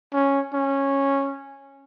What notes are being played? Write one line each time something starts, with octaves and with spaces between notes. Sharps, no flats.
C#4
C#4